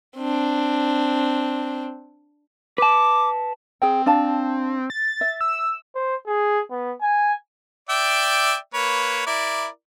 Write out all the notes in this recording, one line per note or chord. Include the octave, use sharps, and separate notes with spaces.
C4 D4
B4 A5 D6
C4 G#4 G5
D4 F5 A5
A6
E5
E6
C5
G#4
B3
G#5
D5 E5 G5
A#3 B4 C#5
E4 A#4 D5